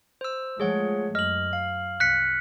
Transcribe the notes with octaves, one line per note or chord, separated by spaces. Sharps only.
C5 E6
F3 G#3 A3 G#4 C#5 F#5
F#2 D#5 F6 F#7
F5
C2 F#6 B6 C#7